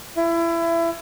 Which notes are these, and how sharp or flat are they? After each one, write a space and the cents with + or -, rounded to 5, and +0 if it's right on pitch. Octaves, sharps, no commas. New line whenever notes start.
E4 +25